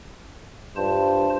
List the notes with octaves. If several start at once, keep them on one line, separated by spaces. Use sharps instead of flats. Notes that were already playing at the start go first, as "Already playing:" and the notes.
G2 F4 C5 A5